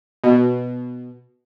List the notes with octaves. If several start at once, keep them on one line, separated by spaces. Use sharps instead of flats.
B2